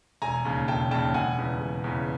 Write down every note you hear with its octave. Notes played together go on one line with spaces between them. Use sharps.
E1 G#5 A#5
D#2 C#3
E1 G5 A5
D#2 C#3 G5 A5
E1 F#5 G#5
E2 C#3
E1
E2 C#3